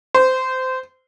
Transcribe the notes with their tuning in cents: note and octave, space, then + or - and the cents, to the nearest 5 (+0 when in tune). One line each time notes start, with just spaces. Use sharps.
C5 -20